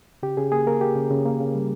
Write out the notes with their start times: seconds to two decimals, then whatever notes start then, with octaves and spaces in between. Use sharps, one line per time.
0.23 C#3 G4
0.37 C#3 G#4
0.52 A#3 G#4
0.66 A#3 A#4
0.81 A#3 G4
0.96 C#3
1.11 C#3
1.25 A#3
1.40 C#3
1.54 G3